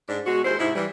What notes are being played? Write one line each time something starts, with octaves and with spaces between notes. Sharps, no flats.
G#2 D4
B2 G#3 F#4
D#2 G#3 E4 C5
G#2 C3 D#4 E4
E3 G3